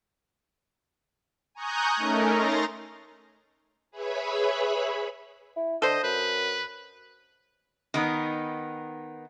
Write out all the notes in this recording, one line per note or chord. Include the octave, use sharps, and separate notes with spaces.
G#5 A#5 C#6 D#6 F#6 G6
A3 C#4 D#4 A#4
A#5 C6 A6 A#6
G#4 B4 C#5 E5 B5
E4
D3 A4 C5 D#5
F#2 B4
D#3 B3 D#4